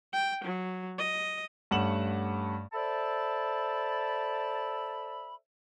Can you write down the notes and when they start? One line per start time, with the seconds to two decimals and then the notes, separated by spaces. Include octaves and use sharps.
0.13 G5
0.45 F#3
0.98 D#5
1.71 G2 A3 C#4 F#5 E7 F#7
2.73 A4 C5 D5 E5 A5 B5